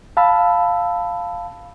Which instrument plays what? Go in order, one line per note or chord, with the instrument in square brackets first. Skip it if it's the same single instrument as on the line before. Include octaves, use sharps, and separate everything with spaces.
[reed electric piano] F5 A5 B5 E6